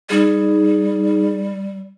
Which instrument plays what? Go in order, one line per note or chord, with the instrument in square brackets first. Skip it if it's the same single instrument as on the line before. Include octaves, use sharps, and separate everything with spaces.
[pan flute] G3 [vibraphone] D#4 G#4